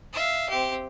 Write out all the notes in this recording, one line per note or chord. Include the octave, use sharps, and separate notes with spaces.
E5 F5
C4 G4